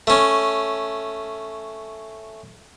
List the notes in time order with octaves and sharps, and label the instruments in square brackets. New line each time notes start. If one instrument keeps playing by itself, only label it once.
[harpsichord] A3 C#4